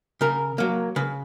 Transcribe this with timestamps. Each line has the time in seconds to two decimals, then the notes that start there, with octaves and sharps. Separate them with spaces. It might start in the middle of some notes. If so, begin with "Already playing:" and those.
0.21 C#3 A#4
0.58 F#3 A#3
0.96 C#3 B4